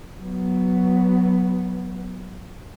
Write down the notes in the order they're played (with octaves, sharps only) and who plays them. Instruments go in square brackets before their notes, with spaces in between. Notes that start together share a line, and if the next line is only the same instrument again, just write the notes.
[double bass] F#3 B3